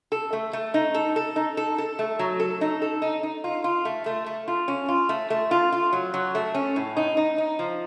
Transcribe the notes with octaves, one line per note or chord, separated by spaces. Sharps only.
A4
A3
A3
D#4
A4
A4
D#4
A4
A4
A3
F#3
A4
D#4
A4
D#4
D#4
F4
F4
A3
A3
A3
F4
C#4
F4
A3
A3
F4
F4
F#3
F#3
A3
C#4
A2
D#4
D#4
D#4
F3